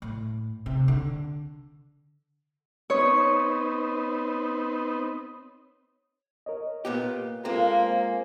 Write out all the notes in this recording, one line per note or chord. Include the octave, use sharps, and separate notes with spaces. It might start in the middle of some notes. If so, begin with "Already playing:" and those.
A2
C3
D3
B3 C4 D#4 C#5
A#4 C#5 D#5
A#2 B3 G4
G#3 A#3 C4 F4 A4
C5 G#5